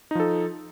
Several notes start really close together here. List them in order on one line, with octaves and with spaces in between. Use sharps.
D#4 F3 A4